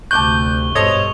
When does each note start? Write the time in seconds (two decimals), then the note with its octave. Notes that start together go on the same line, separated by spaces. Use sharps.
0.11 D2 C3 A5 C#6 D6 F#6 G6 G7
0.75 G2 B2 A4 C5 C#5 D#5 D#6 F7